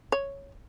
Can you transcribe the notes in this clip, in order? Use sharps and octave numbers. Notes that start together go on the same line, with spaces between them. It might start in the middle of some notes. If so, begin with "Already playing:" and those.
C#5